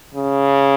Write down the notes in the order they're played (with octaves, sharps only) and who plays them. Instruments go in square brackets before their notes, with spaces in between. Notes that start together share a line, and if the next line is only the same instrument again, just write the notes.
[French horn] C#3